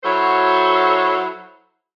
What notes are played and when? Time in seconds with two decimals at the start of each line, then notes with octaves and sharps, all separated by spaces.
0.04 F#3 E4 F#4 A4 C5 C#5